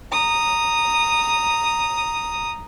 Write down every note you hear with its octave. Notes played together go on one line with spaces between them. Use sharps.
A#5 D#6